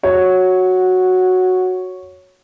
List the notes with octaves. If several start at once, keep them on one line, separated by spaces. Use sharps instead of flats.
F#4 C#5